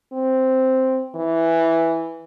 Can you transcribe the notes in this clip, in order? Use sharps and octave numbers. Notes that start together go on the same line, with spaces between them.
C4
E3